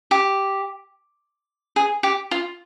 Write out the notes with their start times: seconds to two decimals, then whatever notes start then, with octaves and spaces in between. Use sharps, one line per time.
0.11 G4
1.76 G#4
2.03 G4
2.31 F4